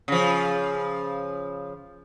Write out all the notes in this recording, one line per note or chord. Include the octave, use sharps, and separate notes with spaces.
C#3 F3